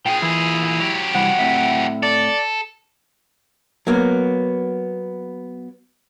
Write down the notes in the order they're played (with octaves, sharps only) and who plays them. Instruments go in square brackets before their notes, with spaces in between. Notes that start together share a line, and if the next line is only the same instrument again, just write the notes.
[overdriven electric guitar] A#2 G#4 [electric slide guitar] G5
[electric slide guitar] E3 [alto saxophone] E4
[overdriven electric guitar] F#3 G4
[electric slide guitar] C3 E3 G3 [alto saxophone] F#5
[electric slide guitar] A2 C4 E5
[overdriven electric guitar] A4 [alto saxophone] D5
[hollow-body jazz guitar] F#3 A#3 B3